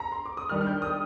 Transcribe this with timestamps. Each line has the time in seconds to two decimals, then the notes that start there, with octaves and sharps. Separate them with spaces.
0.00 A#5
0.12 C6
0.26 D6
0.37 D#6
0.49 D#3 G3 D4 F6
0.61 F6
0.67 G6
0.82 D#6